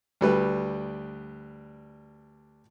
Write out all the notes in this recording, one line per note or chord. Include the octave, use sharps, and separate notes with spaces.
D2 G3 B4